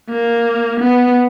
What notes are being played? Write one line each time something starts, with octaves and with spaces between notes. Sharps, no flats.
A#3
B3